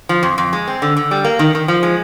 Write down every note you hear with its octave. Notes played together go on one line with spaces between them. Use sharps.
F3
F2
F2
G#3
C4
D3
D3
G3
A#3
D#3
D#3
F3
G#3